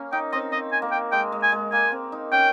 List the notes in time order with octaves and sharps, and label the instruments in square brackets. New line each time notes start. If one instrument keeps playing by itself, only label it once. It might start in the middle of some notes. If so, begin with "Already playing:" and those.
Already playing: [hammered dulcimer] A#3 C#4
[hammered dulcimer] D#4 [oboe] G5
[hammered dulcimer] C4 [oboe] D#5
[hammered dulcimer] C4 [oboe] D#5
[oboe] G#5
[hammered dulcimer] A#3
[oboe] G5
[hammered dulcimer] G#3 [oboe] G5
[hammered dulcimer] G#3
[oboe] G#5
[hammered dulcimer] G#3
[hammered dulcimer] A#3 [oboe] G#5
[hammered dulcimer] C4
D#4
[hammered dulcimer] C#4 [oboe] G5